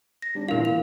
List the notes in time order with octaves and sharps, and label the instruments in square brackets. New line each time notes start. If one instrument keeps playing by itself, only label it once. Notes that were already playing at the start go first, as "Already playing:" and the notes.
[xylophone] A#6
[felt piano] G3 D4
[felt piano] A#2 E3 [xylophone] A#4 F5
[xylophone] F7